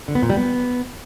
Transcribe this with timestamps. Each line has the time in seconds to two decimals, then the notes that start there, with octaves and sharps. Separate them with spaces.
0.08 D3
0.15 B3
0.22 A#2
0.30 G3
0.37 B3